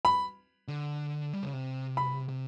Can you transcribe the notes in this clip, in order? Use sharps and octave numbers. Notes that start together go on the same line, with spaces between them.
B5
D3
G3
C#3
C3
B5
C3